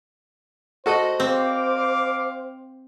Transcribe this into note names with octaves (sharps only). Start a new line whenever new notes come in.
F#4 A4 C5 D#5
C4 F5 D6